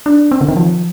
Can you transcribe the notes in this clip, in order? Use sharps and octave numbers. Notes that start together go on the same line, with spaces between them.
D4
C4
D3
D#3
F3